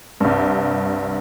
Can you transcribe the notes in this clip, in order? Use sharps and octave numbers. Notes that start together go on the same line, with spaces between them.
C2 G2